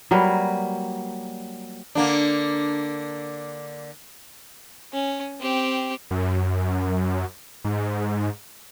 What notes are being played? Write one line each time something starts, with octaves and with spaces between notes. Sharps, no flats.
F#3 G3 A#3 B4
D3 A#3 D4
C#4
C4 G4
F#2
G#2